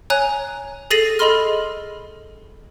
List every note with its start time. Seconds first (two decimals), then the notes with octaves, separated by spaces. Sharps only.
0.10 C#5 G#5 A#5 F#6
0.91 G#4 A4 A6 A#6 C7 D#7
1.19 G#4 A4 D#5 B5 C6 F6